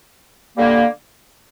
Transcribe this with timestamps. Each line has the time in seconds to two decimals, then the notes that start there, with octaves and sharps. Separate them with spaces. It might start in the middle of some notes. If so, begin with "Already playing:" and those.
0.56 D3 G3 A#3